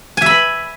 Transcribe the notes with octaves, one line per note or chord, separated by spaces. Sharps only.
E5 G#5 B5